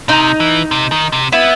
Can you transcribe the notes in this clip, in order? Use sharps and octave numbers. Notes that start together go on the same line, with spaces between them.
C3 D#4
E3
C3
D#3
C3
B3 E4